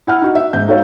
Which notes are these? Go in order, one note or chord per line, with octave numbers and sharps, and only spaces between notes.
E4 F#5 F6
D#4 F#4
E5
G#2 G6
D#4 F#4 A4 C5 C#5 F5